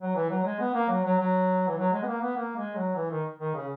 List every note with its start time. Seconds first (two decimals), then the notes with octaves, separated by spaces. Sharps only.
0.02 F#3
0.16 E3
0.31 F#3
0.45 G#3
0.60 B3
0.75 A#3
0.89 F#3
1.04 F#3
1.19 F#3
1.68 E3
1.78 F#3
1.93 G#3
2.03 B3
2.07 A#3
2.22 B3
2.37 A#3
2.57 G#3
2.76 F#3
2.96 E3
3.11 D#3
3.40 D#3
3.55 C#3